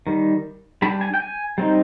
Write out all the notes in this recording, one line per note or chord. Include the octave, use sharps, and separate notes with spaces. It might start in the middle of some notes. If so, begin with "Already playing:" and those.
D#3 G3
G3 D4 B5
G#5
G5
G#5
G3 C4 D#4